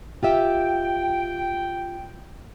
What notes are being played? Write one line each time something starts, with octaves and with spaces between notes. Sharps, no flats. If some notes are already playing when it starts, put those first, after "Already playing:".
F4 G4 E5 G5